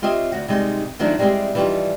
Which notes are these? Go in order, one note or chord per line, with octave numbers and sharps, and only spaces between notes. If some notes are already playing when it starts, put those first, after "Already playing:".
C4 F4 G4 C#5 D#5 E5
D2 F#4
C3 G3 G#3 D#4
D#3 F3 F#3 A3 D4
G3 G#3 B3 C4 E4 G4
E3 F3 G3 D4 D#4 F4